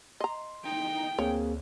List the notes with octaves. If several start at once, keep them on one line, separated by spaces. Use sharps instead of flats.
D#5 A#5 C6
D#4 G5
D2 A#3 C4 G#4 C#5